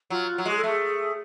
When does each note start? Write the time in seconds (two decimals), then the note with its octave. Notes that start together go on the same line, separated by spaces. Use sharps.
0.10 F#3 F4
0.38 F#3
0.45 G#3 F#4
0.51 G#4
0.57 A4
0.64 A3 G#4